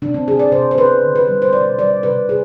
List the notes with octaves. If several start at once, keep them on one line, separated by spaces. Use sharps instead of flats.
C3 D4
C4
C3 G#4
D5
C3 C5
C5
C3 B4
D3
B4
G3
C5
B2 D5
G3 D5
C3 B4
C3 G#4